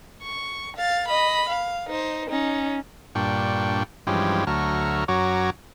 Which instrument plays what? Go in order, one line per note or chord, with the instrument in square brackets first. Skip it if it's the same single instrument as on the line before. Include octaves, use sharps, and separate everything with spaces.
[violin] C#6
F5 A6
D#5 B5
F5
D#4 C5
C#4 D#4
[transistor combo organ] G2 A#2 D4 G5 C#6
G2 E3 F3 G#3 C#4 G4
D2 F#3 A3 A#5 C#6 F6
F#2 F#3 F#4 C#5 A#5 D6